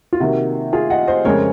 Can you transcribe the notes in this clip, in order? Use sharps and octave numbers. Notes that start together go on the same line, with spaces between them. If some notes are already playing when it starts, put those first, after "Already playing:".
F4
C3 D#3 A#3 F#4
F4 G#4
D#5 F#5
C5 D#5
F2 C#3 G#3 C4 A#4 C#5